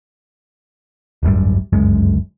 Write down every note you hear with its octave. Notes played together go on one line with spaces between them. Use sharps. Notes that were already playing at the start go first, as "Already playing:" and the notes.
D1 G#1 F#2 G3
G1 C#2 F#2 G#3